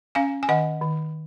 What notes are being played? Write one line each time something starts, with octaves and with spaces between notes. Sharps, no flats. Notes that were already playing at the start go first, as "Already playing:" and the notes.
C#4 F5 G#5
G#5
D#3 D#5 F#5
D#3